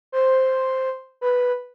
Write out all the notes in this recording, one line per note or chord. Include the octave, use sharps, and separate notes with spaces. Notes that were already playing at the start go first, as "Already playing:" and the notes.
C5
B4